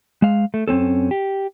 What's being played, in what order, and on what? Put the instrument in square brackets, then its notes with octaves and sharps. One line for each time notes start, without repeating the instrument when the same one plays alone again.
[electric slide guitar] G#3 F5
A3
F#2 C4 C#4 A4
G4